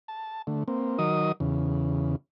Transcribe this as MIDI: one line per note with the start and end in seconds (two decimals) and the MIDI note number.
0.08 0.42 81
0.47 0.63 50
0.47 0.63 57
0.68 0.98 58
0.68 0.98 60
0.99 1.32 51
0.99 1.32 54
0.99 1.32 70
0.99 1.32 75
0.99 1.32 87
1.40 2.16 40
1.40 2.16 49